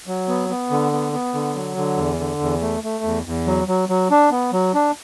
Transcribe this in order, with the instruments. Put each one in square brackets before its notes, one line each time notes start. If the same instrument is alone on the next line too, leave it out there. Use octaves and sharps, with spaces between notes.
[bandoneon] F#3
B3
B3
D3
B3
B3
D3
F#3
D3
E2
D3
E2
A3
A3
E2
E2
F#3
F#3
F#3
D4
B3
F#3
D4